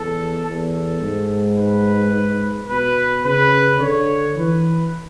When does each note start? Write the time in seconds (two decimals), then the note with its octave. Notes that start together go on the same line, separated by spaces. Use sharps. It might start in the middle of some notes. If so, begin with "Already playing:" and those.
Already playing: E2 A4
0.46 E2 A4
1.02 G#2
1.57 B4
2.69 B2 B4
3.25 C#3 B4
3.80 D3 C#5
4.36 E3 B4